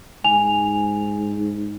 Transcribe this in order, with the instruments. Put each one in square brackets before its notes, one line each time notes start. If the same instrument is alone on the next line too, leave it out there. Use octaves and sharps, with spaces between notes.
[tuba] G#2 [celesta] G#5 F7